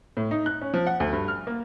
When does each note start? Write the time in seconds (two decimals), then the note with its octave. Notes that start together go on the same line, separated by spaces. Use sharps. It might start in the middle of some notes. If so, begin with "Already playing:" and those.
0.17 A2
0.31 D#4
0.46 F#6
0.61 C#4
0.74 F3
0.87 F#5
1.00 D2
1.12 G2
1.28 F6
1.47 A#3